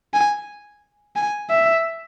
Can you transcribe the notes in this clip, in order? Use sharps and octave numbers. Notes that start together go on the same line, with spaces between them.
G#5
G#5
E5